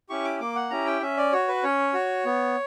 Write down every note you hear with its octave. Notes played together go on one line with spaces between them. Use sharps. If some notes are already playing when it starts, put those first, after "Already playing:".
C#4 E4 G4 C#6
D6
A#3 D6
F#5
C#4 E4 G4 A#5
G5
C#4 E5
D5
F#4 C#5
B4
C#4 C#5
F#4
B3